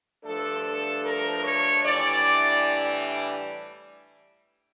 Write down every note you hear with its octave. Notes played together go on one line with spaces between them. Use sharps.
G2 F3 A3 D4 A4
A#4
C#5
A2 E3 G3 D4 D5